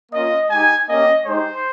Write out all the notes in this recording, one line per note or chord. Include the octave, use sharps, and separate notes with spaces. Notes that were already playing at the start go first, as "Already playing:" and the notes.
A#3 C#4 F4 D#5
G#3 D#4 G4 G#5
A#3 C#4 G4 D#5
G#3 D#4 G4 C5